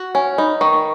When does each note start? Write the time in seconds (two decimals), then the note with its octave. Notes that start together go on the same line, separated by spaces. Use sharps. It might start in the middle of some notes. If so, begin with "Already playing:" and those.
Already playing: F#4
0.15 C#4 G#5
0.38 D#4 B5
0.61 D#3 C#6
0.73 C#6